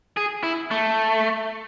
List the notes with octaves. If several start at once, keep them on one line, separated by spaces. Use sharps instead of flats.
G#4
E4
A3